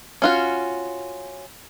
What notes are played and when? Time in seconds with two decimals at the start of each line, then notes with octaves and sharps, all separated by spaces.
0.22 C#4 F4 F#4